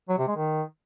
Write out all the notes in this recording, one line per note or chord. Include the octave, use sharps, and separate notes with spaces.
F#3
C3
G#3
D#3